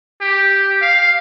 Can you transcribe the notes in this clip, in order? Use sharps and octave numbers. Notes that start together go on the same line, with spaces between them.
G4
F5